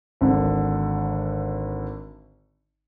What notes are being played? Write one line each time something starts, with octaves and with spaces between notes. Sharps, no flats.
G#1 D3